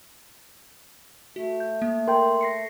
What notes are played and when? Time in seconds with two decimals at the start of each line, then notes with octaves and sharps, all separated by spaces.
1.36 A3 F#4
1.60 G6
1.82 A#3
2.08 A#4 G5 C6
2.41 A#6 C7 C#7